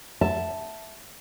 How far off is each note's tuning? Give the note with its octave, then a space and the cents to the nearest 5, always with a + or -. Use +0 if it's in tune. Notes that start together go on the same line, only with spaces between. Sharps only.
E5 +0 A5 +0